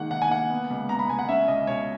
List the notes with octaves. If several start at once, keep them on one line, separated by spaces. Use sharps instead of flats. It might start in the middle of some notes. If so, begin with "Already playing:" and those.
Already playing: D#3 G#3 A#3 F#5
D#3 F#5
G#5
A#3 F#5
B3
C#2
B3 A#5
B5
C#2 G#5
F#5
C#4 E5
C#2 D#5
B2 C#5